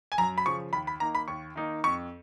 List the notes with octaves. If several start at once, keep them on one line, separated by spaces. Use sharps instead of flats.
G#5
F#2 A#5
B5
C#3 F3 C#6
D#2 B5
B5
D#3 A#3 D#4 A#5
B5
D#2 C#6
D#3 A#3 D#4
F2 C#6